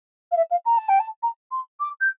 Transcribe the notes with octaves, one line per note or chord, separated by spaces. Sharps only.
F5
E5
F5
A#5
A5
G5
A5
A#5
C6
D6
G6